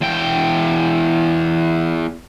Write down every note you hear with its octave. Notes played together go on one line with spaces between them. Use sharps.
E2 G5